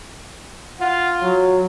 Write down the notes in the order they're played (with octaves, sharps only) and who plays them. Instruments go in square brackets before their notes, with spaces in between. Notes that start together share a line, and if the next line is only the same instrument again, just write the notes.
[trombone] F4 [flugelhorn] F#5
[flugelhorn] F#3